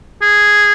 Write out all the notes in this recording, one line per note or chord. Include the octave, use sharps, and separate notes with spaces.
G#4